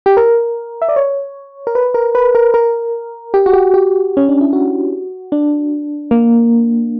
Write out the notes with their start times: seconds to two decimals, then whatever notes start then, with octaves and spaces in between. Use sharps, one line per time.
0.06 G4
0.17 A#4
0.82 E5
0.89 D5
0.96 C#5
1.67 A#4
1.75 B4
1.94 A#4
2.15 B4
2.35 A#4
2.54 A#4
3.34 G4
3.46 F#4
3.53 G4
3.74 G4
4.17 C#4
4.29 D4
4.41 E4
4.53 F#4
5.32 D4
6.11 A#3